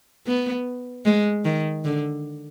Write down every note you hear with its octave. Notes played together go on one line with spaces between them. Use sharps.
B3
G#3
D#3
D3